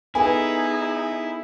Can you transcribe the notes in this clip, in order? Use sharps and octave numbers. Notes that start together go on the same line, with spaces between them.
B3 D#4 E4 G#4 A4 B4 G#5